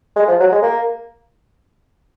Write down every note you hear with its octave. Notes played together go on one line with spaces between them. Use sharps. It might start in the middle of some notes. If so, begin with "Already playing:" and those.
G#3
F3
F#3
G#3
A#3